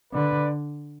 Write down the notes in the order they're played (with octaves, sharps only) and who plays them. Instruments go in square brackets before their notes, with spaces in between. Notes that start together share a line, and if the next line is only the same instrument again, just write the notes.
[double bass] D3 [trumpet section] B4 D5